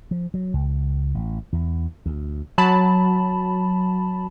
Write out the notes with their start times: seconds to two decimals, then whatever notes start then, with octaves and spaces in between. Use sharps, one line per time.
0.11 F3
0.34 F#3
0.54 C#2
1.15 A1
1.53 E2
2.06 D2
2.58 F#3 A5 B5